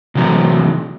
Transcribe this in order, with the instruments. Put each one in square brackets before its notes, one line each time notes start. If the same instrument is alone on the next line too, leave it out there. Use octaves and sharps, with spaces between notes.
[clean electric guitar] C3 E3 F#3 C4